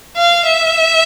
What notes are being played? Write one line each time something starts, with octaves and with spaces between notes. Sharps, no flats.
F5
E5